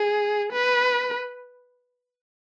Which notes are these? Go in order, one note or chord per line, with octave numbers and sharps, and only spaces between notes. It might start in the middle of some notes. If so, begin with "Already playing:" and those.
Already playing: G#4
B4